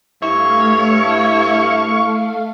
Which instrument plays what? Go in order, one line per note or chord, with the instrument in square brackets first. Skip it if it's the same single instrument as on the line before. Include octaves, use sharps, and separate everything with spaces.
[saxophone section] G2 E4 [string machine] A3 F5 [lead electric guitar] C#5